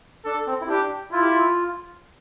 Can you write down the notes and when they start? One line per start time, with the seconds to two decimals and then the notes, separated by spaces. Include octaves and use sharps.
0.25 D4 A4
0.47 C4
0.61 E4
0.68 D4 G4
1.12 E4 F4
1.22 G4
1.30 F4